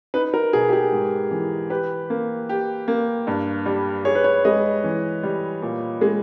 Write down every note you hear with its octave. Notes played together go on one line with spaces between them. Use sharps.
D#4 B4
A#4
B2 G#4
G4
G#4
G#2
E3
G4 B4
A#3
G4
A#3
G2
G3
G#4 C#5
B4
C#5
G#3 D#5
E3
G3
A#2
G#3